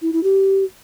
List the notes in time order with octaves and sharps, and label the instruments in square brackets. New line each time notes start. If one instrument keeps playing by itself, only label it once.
[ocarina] E4
E4
G4